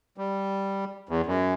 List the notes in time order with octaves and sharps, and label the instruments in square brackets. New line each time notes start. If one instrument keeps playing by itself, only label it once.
[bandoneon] G3
E2
F#2